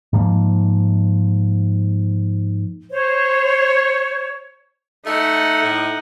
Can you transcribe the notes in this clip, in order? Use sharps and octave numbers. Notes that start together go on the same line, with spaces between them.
G#2 F3 A#3
C5 C#5
A3 D#4 F#5
A2